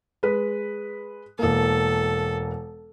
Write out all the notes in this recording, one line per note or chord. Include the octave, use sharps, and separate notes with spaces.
G#3 B4
E1 A#3 A4